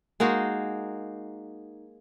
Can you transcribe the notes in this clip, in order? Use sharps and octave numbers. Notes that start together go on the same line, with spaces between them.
G#3 A#3 D#4 F#4